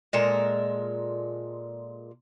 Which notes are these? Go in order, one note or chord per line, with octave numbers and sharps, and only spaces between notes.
A#2 G#3 A4 A#4